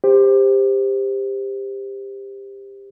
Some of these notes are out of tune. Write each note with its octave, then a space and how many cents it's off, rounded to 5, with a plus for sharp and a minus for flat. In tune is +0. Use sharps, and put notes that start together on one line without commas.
G4 +20 C5 +0